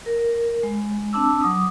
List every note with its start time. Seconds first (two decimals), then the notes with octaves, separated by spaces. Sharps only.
0.06 A#4
0.63 G#3
1.13 C4 D4 A5 D6 E6
1.42 F#3 D6 D#6